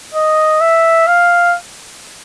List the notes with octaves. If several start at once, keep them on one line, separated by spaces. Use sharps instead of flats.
D#5
E5
F5